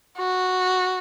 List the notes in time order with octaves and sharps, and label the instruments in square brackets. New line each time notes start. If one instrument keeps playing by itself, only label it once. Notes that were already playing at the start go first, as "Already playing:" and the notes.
[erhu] F#4